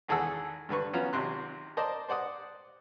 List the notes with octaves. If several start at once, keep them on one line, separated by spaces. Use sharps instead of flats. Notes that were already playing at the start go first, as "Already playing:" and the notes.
G#1 E2 G#4 A4 F#5 E6
G2 D3 B4 C#6
F#3 B3 C#4 F4
G#1 C3 C6 F#6
A#4 C5 D5 D#5 A5
C5 D5 F#5 D#6